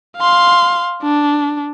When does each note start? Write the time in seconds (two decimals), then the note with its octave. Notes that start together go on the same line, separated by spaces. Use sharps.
0.17 F5 C6
1.02 D4